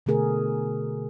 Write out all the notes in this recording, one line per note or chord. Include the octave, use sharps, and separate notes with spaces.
B2 D3 A3 G#4 A#4